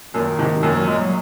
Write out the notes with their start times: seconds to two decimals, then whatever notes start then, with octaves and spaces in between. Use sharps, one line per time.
0.14 F#2 A#2 D#3
0.39 G#2 C3
0.63 F#2 A#2 D#3
0.75 F#3
0.87 G#3
0.99 F#3